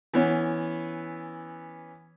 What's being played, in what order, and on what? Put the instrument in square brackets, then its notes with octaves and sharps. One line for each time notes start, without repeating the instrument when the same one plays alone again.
[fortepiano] E3 B3 C#4